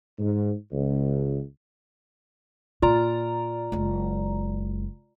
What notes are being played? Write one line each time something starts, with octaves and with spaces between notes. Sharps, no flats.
G#2
C#2
A#2 F4 D5 A#5
F#1 G#3